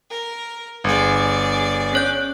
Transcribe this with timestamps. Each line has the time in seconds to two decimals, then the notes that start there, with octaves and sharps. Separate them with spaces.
0.10 A#4
0.84 G1 G#4 D5
1.93 C#4 C#5 G6